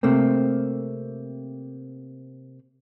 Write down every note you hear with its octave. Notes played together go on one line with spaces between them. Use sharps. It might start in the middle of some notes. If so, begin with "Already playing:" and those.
C3 A3 A#3 C4